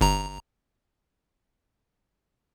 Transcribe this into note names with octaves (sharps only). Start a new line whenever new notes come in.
G1 A#5